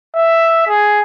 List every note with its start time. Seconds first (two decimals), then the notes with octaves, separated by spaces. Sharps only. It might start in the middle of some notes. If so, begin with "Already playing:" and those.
0.15 E5
0.68 G#4